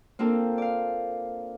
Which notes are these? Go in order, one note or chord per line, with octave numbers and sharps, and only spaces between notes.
A#3 C4 D4 F4 A4 A#4
D5 F5